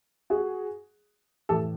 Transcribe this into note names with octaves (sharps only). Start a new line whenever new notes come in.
F#4 G#4
A2 E3 G4 A4